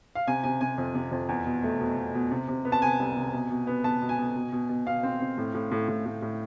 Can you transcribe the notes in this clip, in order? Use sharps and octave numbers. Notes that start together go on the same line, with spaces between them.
F5
C3 G#5
C3 G#5
C3 G#5
F2
C3
F2
E2
B2
A3
B2
B2
B2
C3
C3
B3
A5
C3 G#5
C2
C3
B2
B2
B3
B3 A5
B2
G#5
B2
B2
B2
B2
B2 F5
C4
C4
A2
A2
A2
A2
A2
A2